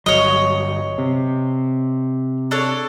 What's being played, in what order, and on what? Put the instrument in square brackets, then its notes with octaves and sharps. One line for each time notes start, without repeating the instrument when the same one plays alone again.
[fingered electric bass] G1 D#2 F#3 [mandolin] C#5 D#5
[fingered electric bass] C3
[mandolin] D4 A4 C#5